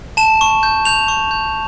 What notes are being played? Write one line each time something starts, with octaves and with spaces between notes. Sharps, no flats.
A5 E7
C#6
G6
G6 F7
C#6
G6